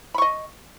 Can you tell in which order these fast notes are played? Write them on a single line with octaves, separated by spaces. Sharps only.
B5 C#6 D#5